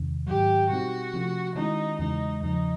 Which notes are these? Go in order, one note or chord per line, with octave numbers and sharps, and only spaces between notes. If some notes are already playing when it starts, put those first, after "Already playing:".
Already playing: E2 C3 D#3
G#2 D#3 F#3 G4
B2 G3 C4 D#4 F#4
C3 F3 A3 C#4 F4
D#3 G#3 C#4 D#4 E4
E2 C#3 E3 G#3 D#4
E2 C#3 F3 D#4